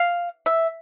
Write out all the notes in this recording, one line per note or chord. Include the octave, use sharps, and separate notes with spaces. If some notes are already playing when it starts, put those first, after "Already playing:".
Already playing: F5
E5